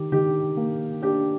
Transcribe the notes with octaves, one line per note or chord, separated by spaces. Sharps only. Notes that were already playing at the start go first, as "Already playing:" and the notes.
Already playing: D#3 G4
D#3 G4
A#3
D4 G4